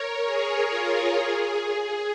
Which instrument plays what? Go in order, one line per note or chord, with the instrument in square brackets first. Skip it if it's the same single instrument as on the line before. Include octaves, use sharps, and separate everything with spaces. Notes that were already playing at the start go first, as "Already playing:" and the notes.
Already playing: [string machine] A#4 C#5
G#4
F4
G#4
G#4